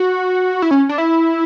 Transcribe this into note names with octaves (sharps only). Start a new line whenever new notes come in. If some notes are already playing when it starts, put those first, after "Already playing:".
Already playing: F#4
E4
C#4
D4
E4